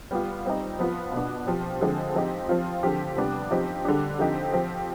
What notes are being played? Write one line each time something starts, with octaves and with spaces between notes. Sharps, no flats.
G3 B3 F4
G3 C4 D#4
F3 B3 F4
B2 B3 D4
F3 C4 G4
D3 F3 G#3 C4
F3 C4 D#4 G4
F3 C4 F4
D3 F3 C4 G4
C3 G3 B3 D4
F3 C4 D#4 G4
D3 G3 D4
D3 F3 C4 D#4 G4
F3 C4 G4